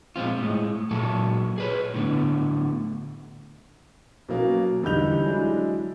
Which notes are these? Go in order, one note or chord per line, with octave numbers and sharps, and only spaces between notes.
A#2 G#3 C4 F4
A2 G#3
A#2 F#3 A4 A5
G#4 B4 C#5
A2 D3 B3
B2 F#3 A#3 C#4
E2 D3 G3 D#4 G6 F7
F#3 G#3 D4 E4